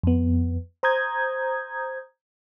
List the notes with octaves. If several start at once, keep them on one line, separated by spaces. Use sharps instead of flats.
F2 B3
C5 A#5 D#6 G6 G#6